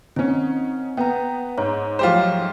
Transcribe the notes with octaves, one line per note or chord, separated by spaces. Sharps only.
D#3 C4 C#4
B3 G5 A#5
G#2 C#5
F3 F#3 A3 F4 G4 C5